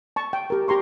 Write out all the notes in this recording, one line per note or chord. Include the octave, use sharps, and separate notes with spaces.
A5 C#6
G5
G4 A#4
G4 A#5 C6 C#6